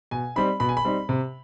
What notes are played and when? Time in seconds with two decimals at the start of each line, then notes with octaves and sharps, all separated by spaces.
0.11 B2 G#5
0.36 G3 C4 D#4 B5
0.60 B2 B5
0.69 G#5
0.77 B5
0.85 G3 C4 D#4
1.09 C3